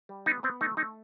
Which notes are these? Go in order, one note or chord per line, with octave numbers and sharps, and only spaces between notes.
G3
B3 D#4
B3 C4
A3 D#4
A3 D#4